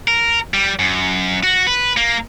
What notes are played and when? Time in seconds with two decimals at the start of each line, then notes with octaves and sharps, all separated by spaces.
0.08 A#4
0.54 G3
0.79 F#2
1.43 F#4
1.67 B4
1.97 A#3